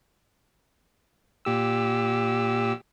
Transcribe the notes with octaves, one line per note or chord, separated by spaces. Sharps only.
A#2 G4 E6